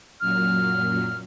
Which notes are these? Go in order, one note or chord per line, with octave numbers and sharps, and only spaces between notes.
F#2 A#2 F#3 F6